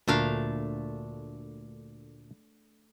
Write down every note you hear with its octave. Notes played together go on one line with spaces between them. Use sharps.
D2 A#2 A3 D4 F5 A#5